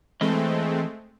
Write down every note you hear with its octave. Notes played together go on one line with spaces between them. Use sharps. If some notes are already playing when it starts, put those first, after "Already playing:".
E3 G#3 A3 C4 D#5